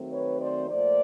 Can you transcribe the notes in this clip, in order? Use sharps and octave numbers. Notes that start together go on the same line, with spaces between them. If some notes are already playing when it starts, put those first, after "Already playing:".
Already playing: D#3 F#3 A3 C4
B4 C#5
C5 D5
A#2 F3 A3 C5 D5